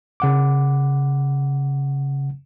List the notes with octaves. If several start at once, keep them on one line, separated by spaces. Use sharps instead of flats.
C#3 F#5 D6